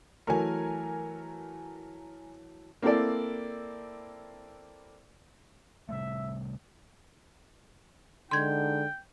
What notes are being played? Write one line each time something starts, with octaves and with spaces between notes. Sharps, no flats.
E3 F#3 A3 A#4 G#5
A#3 C4 E4 A4 D5
C3 G3 A3 E5
D3 G#3 D#4 G5 C6 G#6